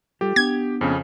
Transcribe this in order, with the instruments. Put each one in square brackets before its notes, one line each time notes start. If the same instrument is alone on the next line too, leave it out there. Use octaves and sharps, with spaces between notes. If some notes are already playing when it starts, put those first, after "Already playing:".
[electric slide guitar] G3 F4 A4 [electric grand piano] G4
[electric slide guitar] B3 D4 [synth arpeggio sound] G#6
[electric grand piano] F2 C#3